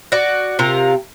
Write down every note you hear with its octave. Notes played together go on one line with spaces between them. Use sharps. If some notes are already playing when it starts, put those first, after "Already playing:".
F#4 D5
C3 F4 A#4